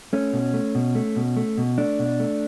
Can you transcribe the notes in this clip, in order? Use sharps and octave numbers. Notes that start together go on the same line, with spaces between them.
A3 C#4
B2
A3
B2
A3
B2
A3
B2
A3 D4
B2
A3